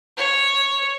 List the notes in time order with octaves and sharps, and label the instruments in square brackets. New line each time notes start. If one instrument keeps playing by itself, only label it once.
[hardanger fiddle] C#5